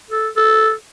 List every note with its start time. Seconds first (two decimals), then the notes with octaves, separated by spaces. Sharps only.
0.11 A4
0.36 A4